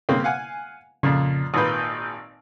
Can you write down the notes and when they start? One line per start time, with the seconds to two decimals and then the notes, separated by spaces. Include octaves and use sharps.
0.09 C#3 A#3 C4
0.24 F5 F#5 G#5
1.03 F2 A#2 C#3
1.54 G#1 A#2 B4 D#6 G6